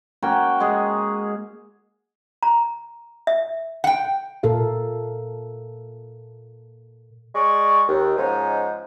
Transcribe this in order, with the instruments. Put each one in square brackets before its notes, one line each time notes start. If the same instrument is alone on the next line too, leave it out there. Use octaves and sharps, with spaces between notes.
[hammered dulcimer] A#3 C#4 F#4 G5
G#3 G#4
[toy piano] A#5
E5
[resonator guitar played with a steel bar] F#5 G5
[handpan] A#2 A4 A#4 F5
[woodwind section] G#3 D5 C#6
D#2
G#2 F3 C#4 D#4